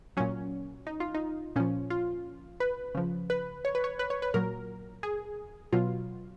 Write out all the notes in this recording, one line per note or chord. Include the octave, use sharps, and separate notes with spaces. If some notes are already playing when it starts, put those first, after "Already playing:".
A#2 F#3 C#4
D#4
F4
D#4
A#2 F3 C#4
F4
B4
C#3 F3
B4
C#5
B4
C#5
B4
C#5
B4
A#2 F#3 A#4
G#4
B2 F#3 F4